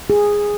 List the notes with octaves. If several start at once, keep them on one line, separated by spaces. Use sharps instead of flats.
G#4